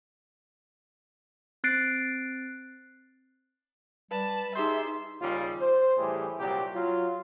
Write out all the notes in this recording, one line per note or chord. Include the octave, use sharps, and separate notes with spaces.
C4 F#6 A6 C7 D7
G3 B4 A5
D#4 G4 G#4 E5 C6 G6
D#2 C#3 G3 F4
C5
A2 E3 G3 G4 G#4
C2 A#2 F#3 G4
F#3 F4